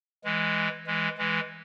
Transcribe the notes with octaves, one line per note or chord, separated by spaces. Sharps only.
E3 G#3
E3 G#3
E3 G#3